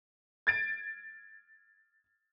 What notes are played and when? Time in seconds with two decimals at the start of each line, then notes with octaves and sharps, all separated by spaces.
0.47 G#6 A6 D7